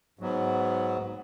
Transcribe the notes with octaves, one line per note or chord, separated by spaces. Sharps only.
G#2 F#3 B3